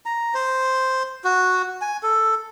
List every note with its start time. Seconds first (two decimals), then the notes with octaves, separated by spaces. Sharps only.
0.06 A#5
0.34 C5
1.24 F#4
1.82 G#5
2.03 A4